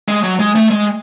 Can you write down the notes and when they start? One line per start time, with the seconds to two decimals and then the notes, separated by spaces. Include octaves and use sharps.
0.08 G#3
0.23 F#3
0.40 G#3
0.55 A3
0.71 G#3